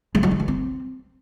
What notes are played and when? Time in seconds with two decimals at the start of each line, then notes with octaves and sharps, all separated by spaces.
0.15 G#3
0.23 F#3
0.31 G#3
0.40 E3
0.48 C4